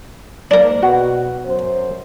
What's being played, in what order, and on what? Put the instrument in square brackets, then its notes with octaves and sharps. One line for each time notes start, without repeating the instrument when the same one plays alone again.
[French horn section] G#2 A#3 [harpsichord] D4 A#4
[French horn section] B2 [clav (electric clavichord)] F#4
[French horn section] F#2 C5